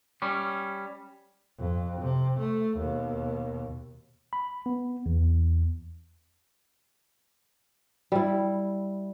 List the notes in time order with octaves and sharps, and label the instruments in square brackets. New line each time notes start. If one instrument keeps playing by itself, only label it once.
[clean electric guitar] G3 C#4
[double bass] F2
C3
A3
D#2 B2
[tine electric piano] B5
B3
E2
[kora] G3 E4